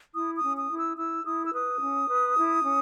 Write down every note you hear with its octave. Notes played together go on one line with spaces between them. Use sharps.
E4 D#6
D#6
C#4
D#6
E4
E6
E4 E6
E4 D#6
E6
B4 D#6
C#4
B4
E4
C#4